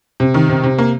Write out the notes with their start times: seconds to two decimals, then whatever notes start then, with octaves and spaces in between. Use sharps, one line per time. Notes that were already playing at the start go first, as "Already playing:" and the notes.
0.20 C3
0.34 D#3
0.49 C3
0.63 C3
0.78 A#3